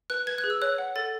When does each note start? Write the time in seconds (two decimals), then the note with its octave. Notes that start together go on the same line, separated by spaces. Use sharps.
0.10 B4 F#6
0.27 B4 G#6
0.38 F#6
0.44 G#4
0.50 E6
0.62 C#5 F#6
0.78 F#5
0.96 A4 A6